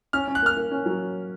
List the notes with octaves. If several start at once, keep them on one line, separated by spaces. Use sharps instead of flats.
C#4 F6
C#4
F#6
A#3 F6
A#3
C#4
F#3